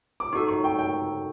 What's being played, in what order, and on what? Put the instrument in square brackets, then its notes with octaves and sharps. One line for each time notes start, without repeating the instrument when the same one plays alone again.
[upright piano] D6
[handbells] D#4 F#4 A4 [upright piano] C#6
[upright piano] C#6
G5
G5